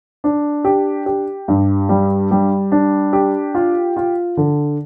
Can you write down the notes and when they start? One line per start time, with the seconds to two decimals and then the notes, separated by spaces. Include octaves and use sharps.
0.24 D4
0.65 G4
1.06 G4
1.48 G2
1.89 G3
2.31 G3
2.72 D4
3.13 G4
3.55 F4
3.97 F4
4.37 D3